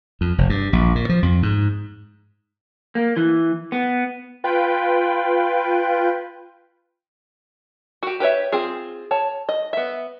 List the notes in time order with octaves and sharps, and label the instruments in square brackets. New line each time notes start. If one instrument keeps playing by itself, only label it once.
[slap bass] F2
F1
G2
A#1
A#2
F3
F2
G#2
[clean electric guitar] A#3
E3
B3
[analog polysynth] F4 B4 G5
[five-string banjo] F#4 G4
G4 B4 C#5 E5
C4 F4 G#4
C#5 A5
D#5
B3 E5